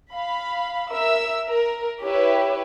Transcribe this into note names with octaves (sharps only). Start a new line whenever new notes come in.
F5 B5
A#4 E5 E6
A#4
E4 G4 B4 C#5 E5